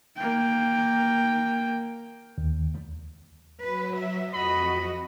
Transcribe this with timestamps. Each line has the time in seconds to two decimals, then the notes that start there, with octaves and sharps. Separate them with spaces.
0.17 A#3 G5
2.38 D#2
3.62 F#3 B4
3.98 E5
4.34 F2 F#4 D#5 B5